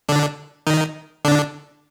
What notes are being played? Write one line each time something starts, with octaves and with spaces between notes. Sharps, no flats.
D3 D4
D#3 D#4
D3 D4